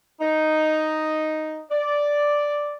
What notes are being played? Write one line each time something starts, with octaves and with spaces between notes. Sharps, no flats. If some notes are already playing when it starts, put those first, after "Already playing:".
D#4
D5